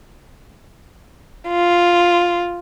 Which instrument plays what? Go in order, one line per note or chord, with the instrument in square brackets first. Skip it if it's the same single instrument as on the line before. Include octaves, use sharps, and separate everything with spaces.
[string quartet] F4